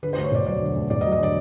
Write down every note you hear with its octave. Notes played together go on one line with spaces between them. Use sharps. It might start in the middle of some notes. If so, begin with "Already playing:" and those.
D3 B4
C5
D2
C#5
E1 D5
F#3 D5
D3
D2
E1 D5
D#5
F#3
D#5
D3 D5